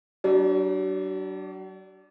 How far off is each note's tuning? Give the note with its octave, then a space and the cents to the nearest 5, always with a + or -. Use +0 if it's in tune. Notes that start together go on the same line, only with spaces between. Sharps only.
F#3 +40 D4 +0